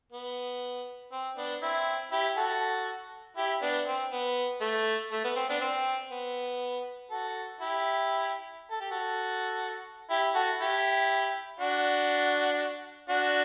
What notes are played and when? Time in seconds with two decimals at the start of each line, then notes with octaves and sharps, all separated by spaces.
0.12 B3
1.12 C4
1.37 B3 D4
1.62 C4 E4
2.12 E4 G4
2.37 F#4 A4
3.37 E4 G4
3.62 B3 D4
3.87 C4
4.12 B3
4.61 A3
5.12 A3
5.24 B3
5.36 C4
5.49 B3 D4
5.61 C4
6.11 B3
7.11 F#4 A4
7.61 E4 G4
8.71 A4
8.81 G4
8.91 F#4 A4
10.10 E4 G4
10.35 F#4 A4
10.60 E4 G4
11.59 D4 F#4
13.09 D4 F#4